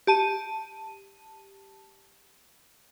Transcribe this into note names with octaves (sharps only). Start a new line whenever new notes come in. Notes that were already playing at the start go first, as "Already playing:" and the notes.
G4 A5 D#7